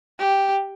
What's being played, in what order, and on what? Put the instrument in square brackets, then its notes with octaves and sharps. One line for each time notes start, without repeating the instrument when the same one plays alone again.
[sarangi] G4